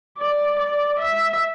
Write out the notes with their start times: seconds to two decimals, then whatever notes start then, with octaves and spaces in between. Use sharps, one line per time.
0.18 D5
0.59 D5
1.00 E5